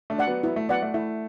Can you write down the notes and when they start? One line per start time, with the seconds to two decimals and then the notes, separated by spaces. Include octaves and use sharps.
0.10 A3 D4
0.19 D5 F#5
0.27 F#3 B3
0.43 F#3 B3 E4
0.56 A3
0.69 F#3 B3 D5 F#5
0.82 A3
0.94 A3 E4